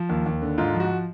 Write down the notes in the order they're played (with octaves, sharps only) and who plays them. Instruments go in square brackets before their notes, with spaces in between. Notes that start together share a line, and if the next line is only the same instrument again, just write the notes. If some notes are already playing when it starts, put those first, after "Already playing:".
Already playing: [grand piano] F3
D#2
D#2
D3
G#2 F4
F3
F#4